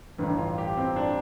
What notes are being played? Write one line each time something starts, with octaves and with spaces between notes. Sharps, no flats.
A1 G2 D3
F4
G4
C4
D4